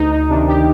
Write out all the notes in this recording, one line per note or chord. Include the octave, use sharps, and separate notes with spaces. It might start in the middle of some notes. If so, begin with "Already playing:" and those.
Already playing: D2 D#4
D#4
C3 D#3 D4
G4